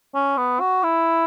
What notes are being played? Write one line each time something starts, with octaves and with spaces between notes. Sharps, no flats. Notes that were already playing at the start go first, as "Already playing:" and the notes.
C#4
B3
F#4
E4